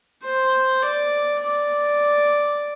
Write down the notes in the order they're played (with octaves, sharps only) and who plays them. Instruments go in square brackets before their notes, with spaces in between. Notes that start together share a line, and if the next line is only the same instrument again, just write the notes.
[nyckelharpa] C5
D5
D5